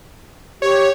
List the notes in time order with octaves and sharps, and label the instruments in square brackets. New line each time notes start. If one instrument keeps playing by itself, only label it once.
[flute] G4 [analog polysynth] C#5